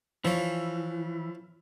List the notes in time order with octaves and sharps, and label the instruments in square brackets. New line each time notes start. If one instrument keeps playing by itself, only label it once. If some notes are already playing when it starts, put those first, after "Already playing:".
[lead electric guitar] E3 [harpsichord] F3 C#5